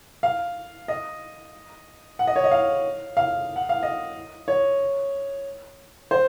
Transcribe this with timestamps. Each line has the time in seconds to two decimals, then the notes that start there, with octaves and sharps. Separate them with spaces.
0.23 F5
0.88 D#5
2.19 F#5
2.27 D#5
2.36 C#5
2.44 D#5
2.51 F5
3.17 F5
3.56 F#5
3.69 F5
3.83 D#5
4.48 C#5
6.11 C5